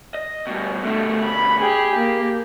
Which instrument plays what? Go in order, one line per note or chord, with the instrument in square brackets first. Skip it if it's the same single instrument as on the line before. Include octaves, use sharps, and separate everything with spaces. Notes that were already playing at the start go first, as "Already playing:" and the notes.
[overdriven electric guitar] D#5
G2 B2
[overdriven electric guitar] B2 D3 [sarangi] A3
[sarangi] B5
[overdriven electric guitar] G4 [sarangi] G#4
[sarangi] A#3